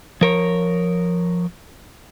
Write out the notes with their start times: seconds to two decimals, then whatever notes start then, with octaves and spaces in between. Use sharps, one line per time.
0.21 F3 A#4 C#5